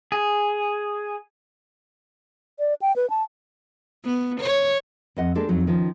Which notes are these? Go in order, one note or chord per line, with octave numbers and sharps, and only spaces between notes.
G#4
D5
G5
B4
A5
B3
C#5
F2 D#5 F#5
G#3 A#3 D4 G4 A4
F2 F#3 D#4
D#3 F3 C#4